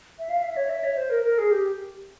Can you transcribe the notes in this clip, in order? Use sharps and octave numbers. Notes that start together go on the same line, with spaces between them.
E5
F5
E5
C#5
E5
C#5
C5
A#4
A#4
G#4
G4